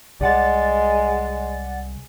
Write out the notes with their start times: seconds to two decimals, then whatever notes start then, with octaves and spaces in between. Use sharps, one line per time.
0.21 C2 G#3 D5 F#5 A6